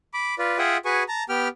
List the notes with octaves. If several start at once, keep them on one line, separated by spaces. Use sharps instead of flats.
B5 D6
F4 B4 D5
F4 G#4 E5 F#5 G5 D#6
F#4 G#4 B4 G#5 C#6
A5 A#5
B3 G4 G5 F6